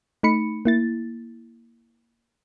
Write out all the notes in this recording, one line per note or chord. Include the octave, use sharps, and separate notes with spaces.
A3 D#4 B5 C#7
A#3 E4 A6